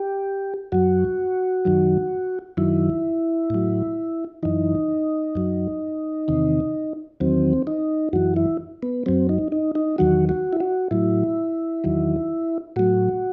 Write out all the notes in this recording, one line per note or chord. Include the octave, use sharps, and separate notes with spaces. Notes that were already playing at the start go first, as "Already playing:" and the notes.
Already playing: G4
F#2 F#3 F#4
F#2 D#3 F#3
F#2 D#3 F#3 E4
A2 F#3
F#2 E3 D#4
F#2 F#3
E2 C3 D#3
E2 D#3 F#3 C4
D#4
F#2 E3 F#4
E4
B3
F#2 F#3 C4
D#4
D#4
D#4
E2 D#3 F#3 F#4
F#4
E4
F#4
A2 F#3 E4
E2 D#3 F#3
A2 F#3 F#4